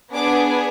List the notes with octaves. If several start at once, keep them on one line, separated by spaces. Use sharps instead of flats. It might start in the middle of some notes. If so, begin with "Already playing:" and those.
B3 D4 G#4 D6